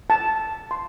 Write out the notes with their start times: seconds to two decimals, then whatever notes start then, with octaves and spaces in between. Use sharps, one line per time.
0.10 A5
0.71 C6